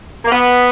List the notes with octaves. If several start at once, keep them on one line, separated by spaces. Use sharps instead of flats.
A#3
B3